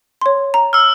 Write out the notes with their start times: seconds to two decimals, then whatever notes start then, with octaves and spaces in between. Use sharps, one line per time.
0.21 C#5 C6
0.54 A#5
0.73 E6 F6